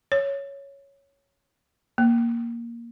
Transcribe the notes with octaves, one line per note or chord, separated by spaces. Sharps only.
C#5
A#3